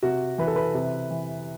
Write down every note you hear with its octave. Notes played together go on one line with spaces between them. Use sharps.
C3 F#4
E3 B4
A4
B4
C3
E3